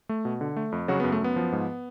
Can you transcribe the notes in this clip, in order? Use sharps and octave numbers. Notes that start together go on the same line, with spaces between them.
A3
B2
D3
A3
F2
C#3 F#3 F#4
B3
F#2
A3
F#2 B3
F3
G#2